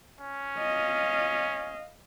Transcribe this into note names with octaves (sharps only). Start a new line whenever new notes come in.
C#4
D#5 F5